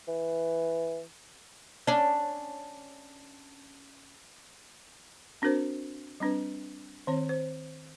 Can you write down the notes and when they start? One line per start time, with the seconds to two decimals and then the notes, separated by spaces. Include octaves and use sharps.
0.08 E3
1.87 C#4 D4
5.42 C4 D4 F#4 A#4 C5
6.20 G3 C4 D4 B4
7.07 D#3 C4 C#5
7.29 C5